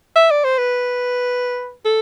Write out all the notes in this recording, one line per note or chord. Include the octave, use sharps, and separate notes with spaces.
E5
D5
C5
B4
A4